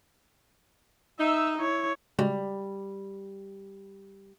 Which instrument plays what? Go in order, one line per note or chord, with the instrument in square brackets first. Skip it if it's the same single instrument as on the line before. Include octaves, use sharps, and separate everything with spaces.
[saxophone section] D#4 [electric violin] E5 E6
[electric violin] E4 C#5
[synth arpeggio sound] C#3 G#3 F#4 [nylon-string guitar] G3